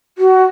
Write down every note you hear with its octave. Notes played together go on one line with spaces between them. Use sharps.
F#4